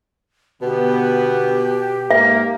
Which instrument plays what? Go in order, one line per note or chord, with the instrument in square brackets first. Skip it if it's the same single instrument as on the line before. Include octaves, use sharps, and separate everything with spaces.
[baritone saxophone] B2 [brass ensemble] D3 B3 [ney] G4
[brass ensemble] G#2 A#3 [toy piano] E5